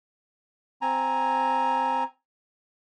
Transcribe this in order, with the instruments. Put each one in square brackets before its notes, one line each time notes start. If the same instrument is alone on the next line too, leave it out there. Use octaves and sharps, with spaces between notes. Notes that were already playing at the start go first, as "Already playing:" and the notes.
[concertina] C4 G#5 A#5